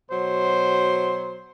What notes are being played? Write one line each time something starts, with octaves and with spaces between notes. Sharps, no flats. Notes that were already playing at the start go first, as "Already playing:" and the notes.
B2 F#3 C5